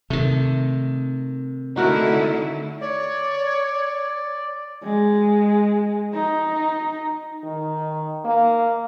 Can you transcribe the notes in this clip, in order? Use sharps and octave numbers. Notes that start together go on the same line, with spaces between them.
C3 D#3 A3
D3 A3 D#4 E4 F#4 A#4
C#5 D5
G#3
D#4
D#3
A#3